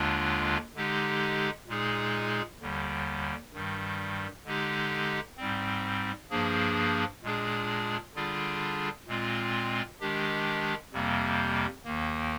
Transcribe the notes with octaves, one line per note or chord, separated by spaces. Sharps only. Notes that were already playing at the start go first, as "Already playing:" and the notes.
Already playing: D#2 D3 G#3 D4 F4
D3 G#3 D#4 G4
A#2 G#3 D#4 G#4
D#2 D3 G3
G2 D#3 G3
D3 G#3 D#4 G4
G#2 G3 C4
G2 F3 A#3 D4 G#4
A#2 G#3 D4 G#4
D3 G3 D4 F4 G#4
A#2 G#3 C4 F4
D#3 G#3 D4 G4
F2 C3 G3 A#3
D#2 D#3 A#3